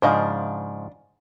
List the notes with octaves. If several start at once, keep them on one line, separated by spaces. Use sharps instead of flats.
G#2 C#3 F3 D4 D#5 F5